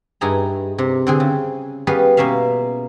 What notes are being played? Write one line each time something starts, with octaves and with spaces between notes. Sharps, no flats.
G2 D#4 E4 G#4 A#5
C3
D3 C4 G#4
C#3
G3 B3 C#4 G#4 B4 F5
B2 A#3 C#4 E5 F5